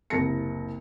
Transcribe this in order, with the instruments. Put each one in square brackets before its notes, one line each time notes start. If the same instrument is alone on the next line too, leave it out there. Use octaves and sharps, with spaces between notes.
[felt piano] F#1 C2 A5 A#6 C#7